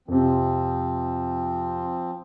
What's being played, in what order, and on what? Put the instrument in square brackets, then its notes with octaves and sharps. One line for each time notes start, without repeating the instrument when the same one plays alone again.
[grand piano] F2 C3 [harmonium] F3 C4